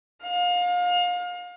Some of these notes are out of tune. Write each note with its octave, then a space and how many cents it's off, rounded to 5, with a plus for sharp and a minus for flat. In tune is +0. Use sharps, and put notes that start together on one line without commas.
F5 +30